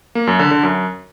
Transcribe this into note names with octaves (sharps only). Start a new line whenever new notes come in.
A#3
F#2
D3
D3
F#2